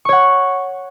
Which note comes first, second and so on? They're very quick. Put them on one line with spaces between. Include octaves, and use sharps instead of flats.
C#6 C#5 F#5